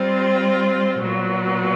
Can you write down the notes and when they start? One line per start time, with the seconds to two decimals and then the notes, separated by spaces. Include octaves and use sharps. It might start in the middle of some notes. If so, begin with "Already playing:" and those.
Already playing: G3 C4 F4
1.00 A#2 F#3 B3